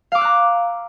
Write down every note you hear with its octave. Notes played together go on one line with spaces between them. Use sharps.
F5 A#5 D6 E6 F#6